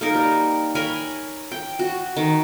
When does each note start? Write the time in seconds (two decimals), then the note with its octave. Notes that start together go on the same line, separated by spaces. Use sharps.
0.01 A#3 D#4 A#4
0.14 G3
0.75 A#4 C#5 G#5 B5
1.52 G5
1.79 F#4
2.17 D#3